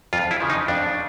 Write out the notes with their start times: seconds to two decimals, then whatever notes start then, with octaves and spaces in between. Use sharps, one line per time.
0.13 F2 F4
0.31 E4
0.40 C#3 F3
0.50 D#4
0.68 F2 D4